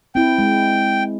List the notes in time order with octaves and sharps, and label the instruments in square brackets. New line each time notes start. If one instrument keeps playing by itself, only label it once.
[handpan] C4 E4 [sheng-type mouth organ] G5
[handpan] G#3